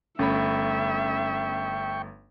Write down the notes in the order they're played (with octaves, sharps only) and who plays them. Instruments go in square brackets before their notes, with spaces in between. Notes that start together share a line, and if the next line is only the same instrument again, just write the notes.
[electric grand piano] G1 A3 [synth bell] C#4 B5 [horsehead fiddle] E5 [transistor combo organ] G5 C#6